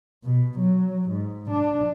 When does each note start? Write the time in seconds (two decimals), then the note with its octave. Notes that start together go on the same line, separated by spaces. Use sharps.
0.24 B2
0.59 F#3
1.10 G#2
1.50 D4